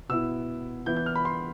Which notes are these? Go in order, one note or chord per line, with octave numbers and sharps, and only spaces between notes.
B2 B3 E4 E6
E3 B3 E4 G6
G6
F6
B5
C6